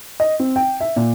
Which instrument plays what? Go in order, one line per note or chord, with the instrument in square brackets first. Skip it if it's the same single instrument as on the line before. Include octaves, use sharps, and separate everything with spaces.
[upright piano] D#5
C4
G5
E5
A#2